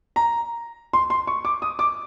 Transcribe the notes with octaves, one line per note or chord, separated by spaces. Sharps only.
A#5
C6
C6
C#6
D6
D#6
D6